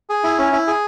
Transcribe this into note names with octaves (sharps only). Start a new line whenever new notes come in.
G#4
E4
C#4
E4
G#4